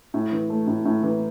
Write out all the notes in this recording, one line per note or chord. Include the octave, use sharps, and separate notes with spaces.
A2
E3
A3
A2
A2
E3